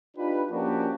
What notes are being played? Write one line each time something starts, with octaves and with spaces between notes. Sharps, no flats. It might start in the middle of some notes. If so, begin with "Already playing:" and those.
D4 D#4 F4 G4 B4
F3 A#3 C#4 D4 F#4 G4